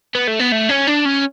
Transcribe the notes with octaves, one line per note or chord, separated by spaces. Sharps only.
B3
A3
B3
A3
C#4
D4
C#4